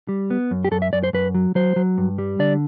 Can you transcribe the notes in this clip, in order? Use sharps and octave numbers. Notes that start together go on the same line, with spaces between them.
G3
B3
F#2
G4
F#2 A4
E5
F#2 D5
C5
F#2 B4
F#3
F#3 C5
F#3
G2
G3
D3 D5